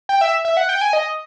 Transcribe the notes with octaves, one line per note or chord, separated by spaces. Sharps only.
G5
E5
E5
F#5
G5
G#5
D#5